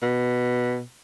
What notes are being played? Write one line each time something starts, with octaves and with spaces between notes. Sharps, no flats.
B2